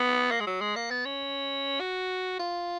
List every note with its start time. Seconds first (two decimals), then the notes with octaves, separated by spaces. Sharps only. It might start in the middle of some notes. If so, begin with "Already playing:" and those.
Already playing: B3
0.31 A#3
0.40 G#3
0.47 F#3
0.61 G#3
0.76 A#3
0.91 B3
1.05 C#4
1.80 F#4
2.39 F4